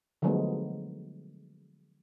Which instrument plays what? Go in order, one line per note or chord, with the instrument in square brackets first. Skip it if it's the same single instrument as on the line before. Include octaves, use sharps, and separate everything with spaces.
[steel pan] D3 F3 F#3 G#3 A3 B3